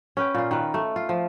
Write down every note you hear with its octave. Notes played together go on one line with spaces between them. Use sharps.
C#4 B4 G5
A#2 F4
D#3 B4
A3
F4
F3